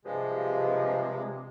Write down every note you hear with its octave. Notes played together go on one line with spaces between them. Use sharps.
G2 C3 F3 G#3